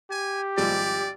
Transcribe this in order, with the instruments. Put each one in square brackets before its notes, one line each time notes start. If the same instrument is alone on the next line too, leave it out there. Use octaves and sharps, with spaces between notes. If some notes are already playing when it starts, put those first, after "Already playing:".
[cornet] G4 [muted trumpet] G#5
[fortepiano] G#1 F3 G3 [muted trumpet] D5